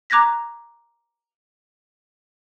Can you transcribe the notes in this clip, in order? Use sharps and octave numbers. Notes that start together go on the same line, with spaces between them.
A#5 D6 F#6 G#6 A#6 B6